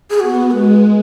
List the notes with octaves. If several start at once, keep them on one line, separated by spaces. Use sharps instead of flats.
G#4
B3 F#4
G#3 B4